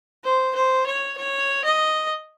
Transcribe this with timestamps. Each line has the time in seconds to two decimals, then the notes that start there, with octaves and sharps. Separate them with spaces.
0.24 C5
0.55 C5
0.87 C#5
1.18 C#5
1.65 D#5